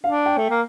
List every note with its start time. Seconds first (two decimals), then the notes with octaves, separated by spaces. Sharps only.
0.03 D4 F5
0.26 G5
0.37 A3
0.50 A#3